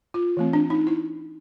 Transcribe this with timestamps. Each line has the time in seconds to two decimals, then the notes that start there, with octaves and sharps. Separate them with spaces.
0.14 F4
0.37 E3 A3 C4
0.53 D4
0.70 D#4
0.87 E4